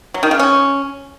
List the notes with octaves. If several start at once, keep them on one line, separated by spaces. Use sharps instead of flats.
F#3
D#3
C#3
C#4